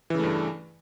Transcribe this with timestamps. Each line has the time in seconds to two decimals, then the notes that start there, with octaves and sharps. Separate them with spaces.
0.10 E3
0.15 C#3
0.19 A3
0.23 G2